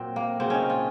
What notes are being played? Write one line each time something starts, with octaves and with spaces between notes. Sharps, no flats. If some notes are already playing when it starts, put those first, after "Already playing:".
Already playing: A#2 F#3 C4
A#3
C#3 F#3 C4
C#4 D#4
F4